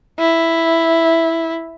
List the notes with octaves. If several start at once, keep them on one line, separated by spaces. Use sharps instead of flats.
E4